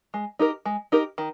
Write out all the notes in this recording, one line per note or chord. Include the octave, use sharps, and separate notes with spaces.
G#3
D#4 G4 A#4
G#3
D#4 G4 A#4
D#3